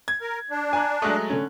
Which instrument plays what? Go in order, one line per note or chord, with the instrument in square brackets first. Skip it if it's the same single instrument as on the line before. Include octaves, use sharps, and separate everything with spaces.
[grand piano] G#6
[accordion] A#4
D4
[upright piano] G#5 A#5 F#6
[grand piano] F#3 G#3 A3 [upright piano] D#6 F#6
[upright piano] D3 C#4